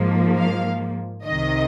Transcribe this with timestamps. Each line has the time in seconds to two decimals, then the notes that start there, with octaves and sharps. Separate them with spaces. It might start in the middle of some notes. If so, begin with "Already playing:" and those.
Already playing: G#2 F3 A#3
0.39 F5
1.25 C2 C3 D#3 D#5